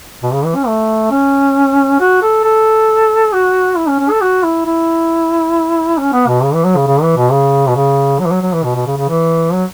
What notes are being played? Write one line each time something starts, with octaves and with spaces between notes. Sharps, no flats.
B2
C#3
E3
C#4
A3
C#4
F#4
A4
A4
F#4
E4
C#4
C#4
A4
F#4
E4
E4
C#4
B3
B2
C#3
E3
F#3
C#3
C#3
E3
B2
C#3
B2
C#3
F#3
E3
F#3
F#3
E3
B2
B2
C#3
C#3
E3
F#3